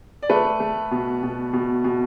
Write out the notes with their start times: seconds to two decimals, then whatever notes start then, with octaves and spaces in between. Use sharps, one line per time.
0.23 D5
0.30 A3 B4
0.60 A3
0.91 B2
1.23 B2
1.53 B2
1.84 B2